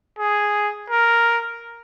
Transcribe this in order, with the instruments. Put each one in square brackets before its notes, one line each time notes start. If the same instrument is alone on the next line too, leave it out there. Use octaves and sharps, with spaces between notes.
[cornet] G#4
A#4